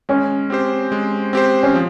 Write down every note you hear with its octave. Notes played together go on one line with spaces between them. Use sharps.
G#3 C#4
C4 G4 C5
G#3
C4 G4 C5
C#4
F3